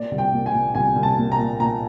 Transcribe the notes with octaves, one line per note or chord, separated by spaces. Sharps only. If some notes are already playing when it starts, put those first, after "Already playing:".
Already playing: A#2 D5
C2
G5
A#2
G#5
A#2
C2 G#5
C2
A5
A#2
A#5
A#2
A#2 A#5